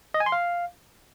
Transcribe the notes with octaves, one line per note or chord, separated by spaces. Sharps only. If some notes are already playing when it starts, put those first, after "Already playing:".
D#5
G#5
C6
F5